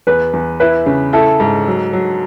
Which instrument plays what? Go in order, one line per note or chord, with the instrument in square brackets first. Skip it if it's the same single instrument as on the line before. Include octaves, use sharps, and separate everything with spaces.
[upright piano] E2 [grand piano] B4
[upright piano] E2
[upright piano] E4 [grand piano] B4
[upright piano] C#3
[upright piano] E4 [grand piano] A4
[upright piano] G#2
F#3
F#3